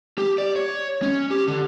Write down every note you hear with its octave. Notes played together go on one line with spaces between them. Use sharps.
G4
D5
C#5
C#4
G4
D3